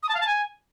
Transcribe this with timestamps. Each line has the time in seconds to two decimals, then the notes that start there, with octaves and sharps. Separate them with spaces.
0.03 D#6
0.09 A5
0.15 F5
0.21 A5
0.27 G#5